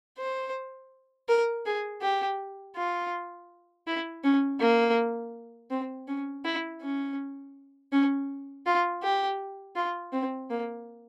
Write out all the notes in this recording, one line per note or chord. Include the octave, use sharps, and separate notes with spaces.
C5
A#4
G#4
G4
F4
E4
C#4
A#3
C4
C#4
E4
C#4
C#4
F4
G4
F4
C4
A#3